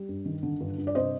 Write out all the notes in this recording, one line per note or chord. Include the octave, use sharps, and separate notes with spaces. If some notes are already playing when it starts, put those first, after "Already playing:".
Already playing: G3
G2
D#3
D3
G2
G2
D5
C3 C5 D#5